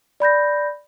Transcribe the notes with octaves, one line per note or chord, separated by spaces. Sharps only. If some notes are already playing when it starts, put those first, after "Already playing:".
D5 B5 G6 A#6